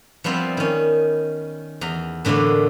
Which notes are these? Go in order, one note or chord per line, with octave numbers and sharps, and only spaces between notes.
F3 G3 B3 C4 E4
D#3 C#4
E2 A#5
A2 D3 E3 A#3 B3